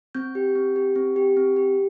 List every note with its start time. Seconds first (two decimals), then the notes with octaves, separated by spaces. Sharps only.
0.15 C4 G6
0.35 G4
0.55 C4
0.76 G4
0.96 C4
1.16 G4
1.37 C4
1.56 G4